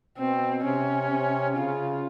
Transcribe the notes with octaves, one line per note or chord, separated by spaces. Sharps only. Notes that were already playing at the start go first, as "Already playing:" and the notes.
B2 C4
C3 C#4
C3
C#3 F4